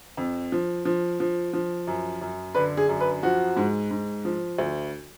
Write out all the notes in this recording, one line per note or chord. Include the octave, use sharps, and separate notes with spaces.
F2
F3
F3
F3
F3
F#2
F#2
D3 B4
G#4
F#2
B4
F3 F#4
G#2
G#2
F3
D2